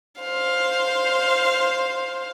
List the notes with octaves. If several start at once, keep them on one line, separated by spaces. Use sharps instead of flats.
C5 F5